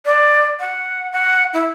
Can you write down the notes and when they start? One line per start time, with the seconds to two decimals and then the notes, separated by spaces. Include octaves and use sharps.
0.05 D5
0.60 F#5
1.12 F#5
1.53 E4